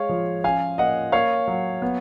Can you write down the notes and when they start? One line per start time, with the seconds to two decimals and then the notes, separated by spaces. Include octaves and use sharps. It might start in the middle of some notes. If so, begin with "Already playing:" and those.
Already playing: G#3 C#5 F5
0.09 F3
0.43 C#4 F5 G#5
0.78 A#3 D#5 F#5
1.12 A#3 C#5 F5
1.48 F#3
1.82 B3